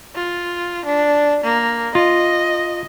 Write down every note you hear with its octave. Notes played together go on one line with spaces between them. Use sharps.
F4
D4
A#3
F4 D#5